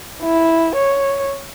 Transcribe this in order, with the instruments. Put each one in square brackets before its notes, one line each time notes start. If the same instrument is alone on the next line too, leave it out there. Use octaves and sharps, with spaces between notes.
[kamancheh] E4
C#5